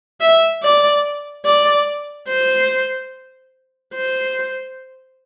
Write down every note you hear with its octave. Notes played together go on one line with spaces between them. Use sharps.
E5
D5
D5
C5
C5